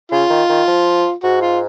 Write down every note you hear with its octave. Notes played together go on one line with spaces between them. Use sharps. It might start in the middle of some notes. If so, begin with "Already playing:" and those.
C#3 F4
D#3
D#3
F3
G#2 F#4
F4